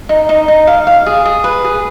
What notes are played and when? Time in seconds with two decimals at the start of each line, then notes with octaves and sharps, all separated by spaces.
0.09 D#4
0.29 D#4
0.48 D#4
0.67 F5
0.87 F5
1.06 G#4
1.25 G#4
1.44 B4
1.64 G#4